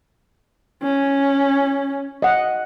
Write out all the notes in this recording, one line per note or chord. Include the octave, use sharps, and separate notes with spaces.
C#4
D#5 F#5